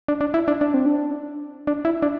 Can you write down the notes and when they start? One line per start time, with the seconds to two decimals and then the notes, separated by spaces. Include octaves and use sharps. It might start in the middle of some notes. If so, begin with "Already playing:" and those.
0.08 D4
0.21 D4
0.34 E4
0.48 D4
0.61 D4
0.74 C4
0.86 D4
1.67 D4
1.85 E4
2.02 D4